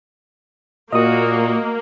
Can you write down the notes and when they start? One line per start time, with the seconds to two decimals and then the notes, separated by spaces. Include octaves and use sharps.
0.92 A#2 A#3 F#4 D#5 D#6